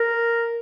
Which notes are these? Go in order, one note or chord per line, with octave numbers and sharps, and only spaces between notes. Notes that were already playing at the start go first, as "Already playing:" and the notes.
Already playing: A#4